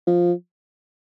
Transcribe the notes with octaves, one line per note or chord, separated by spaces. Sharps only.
F3